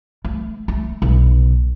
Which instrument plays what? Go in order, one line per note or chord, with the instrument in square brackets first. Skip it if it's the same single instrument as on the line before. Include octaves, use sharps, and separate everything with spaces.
[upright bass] A3
A3
B1